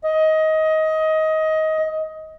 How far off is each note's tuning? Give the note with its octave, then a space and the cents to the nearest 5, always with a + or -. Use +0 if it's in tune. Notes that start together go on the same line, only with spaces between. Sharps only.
D#5 +20